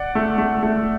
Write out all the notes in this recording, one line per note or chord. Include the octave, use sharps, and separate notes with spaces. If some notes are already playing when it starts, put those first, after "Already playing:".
Already playing: D5 F#5
A3
A3
A3